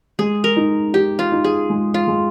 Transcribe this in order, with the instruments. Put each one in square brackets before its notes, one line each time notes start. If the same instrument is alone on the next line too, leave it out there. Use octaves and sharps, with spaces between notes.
[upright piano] G#3 [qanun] G#4
[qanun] A#4
[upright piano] D#4
[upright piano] D#4 [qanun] G4
[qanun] F4
[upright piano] D#4
[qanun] G#4
[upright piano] G#3
[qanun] F4
[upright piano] G#3